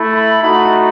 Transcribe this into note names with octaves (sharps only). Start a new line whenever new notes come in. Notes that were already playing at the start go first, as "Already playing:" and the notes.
Already playing: A3 E4
B5
A3 D#4 F#4 B5